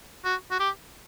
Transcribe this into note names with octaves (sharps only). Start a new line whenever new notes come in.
F#4
F#4
G4